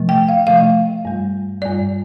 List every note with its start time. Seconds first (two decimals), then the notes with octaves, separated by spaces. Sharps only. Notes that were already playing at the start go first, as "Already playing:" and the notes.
Already playing: C3 F3 A3
0.09 G5
0.29 F5
0.47 C3 F3 A3 F5
1.05 G2 G3
1.62 G2 G3 D5